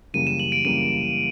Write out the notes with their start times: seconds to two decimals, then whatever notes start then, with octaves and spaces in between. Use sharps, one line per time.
0.14 F#2 C#3 E3 G3 A#3 D#7
0.27 E7
0.40 F#7
0.52 D7
0.65 F#2 C#3 E3 G3 A#3 D#7